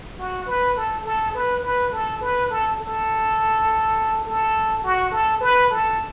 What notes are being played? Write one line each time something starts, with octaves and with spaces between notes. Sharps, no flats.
F#4
B4
A4
A4
B4
B4
A4
B4
A4
A4
A4
F#4
A4
B4
A4